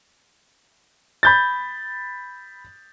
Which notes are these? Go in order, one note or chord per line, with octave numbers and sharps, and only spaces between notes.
B5 G6 A6